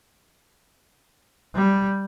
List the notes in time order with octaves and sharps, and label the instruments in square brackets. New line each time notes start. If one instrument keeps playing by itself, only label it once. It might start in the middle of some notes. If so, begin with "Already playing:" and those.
[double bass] G3